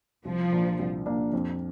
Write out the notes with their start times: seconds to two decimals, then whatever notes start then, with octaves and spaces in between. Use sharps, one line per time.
0.25 C2 F3
0.52 A#2 A#3 D4
0.79 C2
1.06 A#2 A#3 D4
1.33 F2